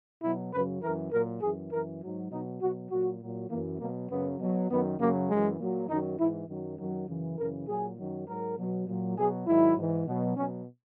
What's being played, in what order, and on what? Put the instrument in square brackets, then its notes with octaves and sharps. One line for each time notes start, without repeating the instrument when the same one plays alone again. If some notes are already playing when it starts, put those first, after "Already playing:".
[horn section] B2 F#3 E4
F#2 C#3 F#3 B4
F#2 E3 A#4
A#2 F#3 A#4
F#2 E3 G#4
F#2 E3 A#4
G#2 F#3
B2 F#3 D#4
B2 F#3 F#4
A#2 F#3 F#4
A#2 F#3
E3 A#3
F#2
B2 F#3 A#3
F#2 C#3 F#3 B3
B2 F#3
F#2 D#3 F#3 B3
F#2 C#3 F#3 A#3
F#2 E3 G#3
A#2 F#3
F#2 D#3 F#3 D#4
G#2 E3 E4
F#2 D#3 F#3
F#2 D#3 F#3
F#2 C#3 E3
F#2 C#3 E3 A#4
A#2 F#3 G#4
F#2 D#3 F#3
G#2 F#3 A#4
B2 F#3
A#2 F#3
B2 F#3 G#4
G#2 D#3 F#3 E4
G#2 E3
B2 F#3
B2 F#3 C#4